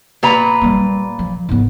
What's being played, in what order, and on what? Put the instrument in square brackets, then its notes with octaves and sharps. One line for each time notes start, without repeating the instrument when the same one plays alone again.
[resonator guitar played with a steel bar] A#2 B4 A#5
[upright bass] G3 A#3
F3
G#2 B3